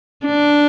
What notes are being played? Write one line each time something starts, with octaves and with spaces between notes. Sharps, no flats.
D4